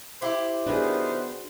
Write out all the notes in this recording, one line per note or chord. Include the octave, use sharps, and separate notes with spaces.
E4 G4 C5
D#3 F#3 B3 D4 F#4 G#4